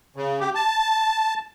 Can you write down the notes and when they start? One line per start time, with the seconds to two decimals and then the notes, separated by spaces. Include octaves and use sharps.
0.16 C#3
0.40 G4
0.55 A5